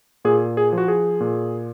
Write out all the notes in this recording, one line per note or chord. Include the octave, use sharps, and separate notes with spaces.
A#2 G#4
G#4
F3
F#4
G#4
A#2